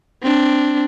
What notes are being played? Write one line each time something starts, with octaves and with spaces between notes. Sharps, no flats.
C4 D4